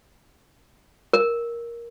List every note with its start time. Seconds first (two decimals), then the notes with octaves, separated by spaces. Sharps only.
1.13 A#4